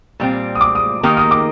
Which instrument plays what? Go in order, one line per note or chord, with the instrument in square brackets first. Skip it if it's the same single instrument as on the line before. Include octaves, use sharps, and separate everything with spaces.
[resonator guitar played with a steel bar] A#2 G3 C4
[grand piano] D#6
D6
D#6
[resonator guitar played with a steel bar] D#3 A#3 D#4 G4 A#4 [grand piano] D#6
[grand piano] D#6
D6